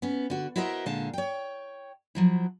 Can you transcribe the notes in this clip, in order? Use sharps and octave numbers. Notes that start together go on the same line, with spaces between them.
B3 C#4
D3 F#4
E4 F#4 A#4 C5 D#5 E5
A#2 D3 G#3 F5 A5
C#5 G5
F3 F#3 E4